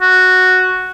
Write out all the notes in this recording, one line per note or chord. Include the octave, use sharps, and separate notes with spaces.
F#4